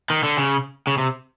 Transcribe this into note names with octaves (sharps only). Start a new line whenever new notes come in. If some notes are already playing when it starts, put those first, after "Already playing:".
D#3
D3
C#3
C#3
C3